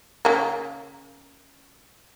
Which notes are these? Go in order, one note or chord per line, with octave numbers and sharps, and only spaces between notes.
C#3 A#3